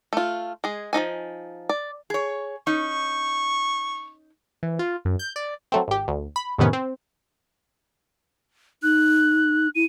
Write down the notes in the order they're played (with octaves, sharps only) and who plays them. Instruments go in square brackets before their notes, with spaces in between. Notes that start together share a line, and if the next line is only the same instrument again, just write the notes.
[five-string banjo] A3 F4
G#3 G#4
F3 F#3 D#4 G#5
D5
[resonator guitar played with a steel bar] G#4 C#5
[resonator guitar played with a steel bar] C#4 D#4 [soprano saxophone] C#6
[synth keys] E3
F4
F#2
G6
D5
[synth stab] F#3 A3 C4
G#1 G4
D2
B5
F2 A2 C3 D#3 B3 C#4
C4
[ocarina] D#4 [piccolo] F#6
[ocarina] E4 [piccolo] D#7